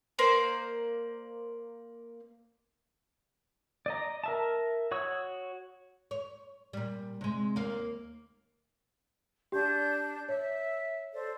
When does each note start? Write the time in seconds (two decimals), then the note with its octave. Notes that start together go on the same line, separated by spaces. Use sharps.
0.19 A#3 C5 D5
3.86 D5 D#5 A#5
4.24 A#4 E5 A5
4.92 F#4 C#5 C#6 D#6 E6
6.11 C#5
6.73 A#2 G3
7.21 C3 G#3
7.56 D#2 A#3 F5
9.52 D4 G4 G6
10.29 C#5 E5
11.13 A4 C5 D5